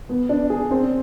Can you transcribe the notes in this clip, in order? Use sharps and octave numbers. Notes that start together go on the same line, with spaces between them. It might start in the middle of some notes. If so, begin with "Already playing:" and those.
B3
D4
G#4
C4